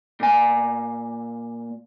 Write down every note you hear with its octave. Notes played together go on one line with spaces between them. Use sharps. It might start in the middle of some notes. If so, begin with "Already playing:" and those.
A#2 G#5